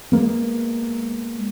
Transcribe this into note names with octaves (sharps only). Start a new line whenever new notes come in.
G#3 A#3 B3